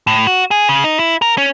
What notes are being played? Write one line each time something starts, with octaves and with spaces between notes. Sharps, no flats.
A2
F#4
G#4
C#3
D#4
E4
A#4
C#4